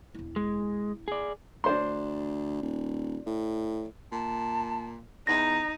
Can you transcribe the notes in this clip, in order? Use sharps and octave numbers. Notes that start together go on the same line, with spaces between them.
E1 E4
G#3
G#4 D5
D2 D4 C5 C6
D#1
A2
A#2 A5
E2 D#4 A#5 A#6